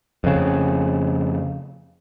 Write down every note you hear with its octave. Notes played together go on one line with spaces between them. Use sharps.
F2 C#3